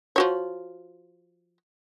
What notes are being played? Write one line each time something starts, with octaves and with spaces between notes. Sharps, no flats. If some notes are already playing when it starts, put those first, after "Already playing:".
F3 F#4 C#5